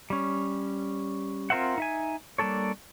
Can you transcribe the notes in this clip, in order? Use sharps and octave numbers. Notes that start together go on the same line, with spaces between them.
G3 C#4
C4 F4 A#4 C5 E5 F#5
D#4 E5 G#5
G3 A#3 D4 A4 C#5